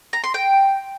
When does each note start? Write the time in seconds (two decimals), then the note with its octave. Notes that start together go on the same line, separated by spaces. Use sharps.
0.13 A#5
0.24 C6
0.34 G5